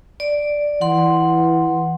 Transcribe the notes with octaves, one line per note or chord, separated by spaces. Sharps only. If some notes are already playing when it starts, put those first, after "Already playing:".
D5
E3 F#5 C6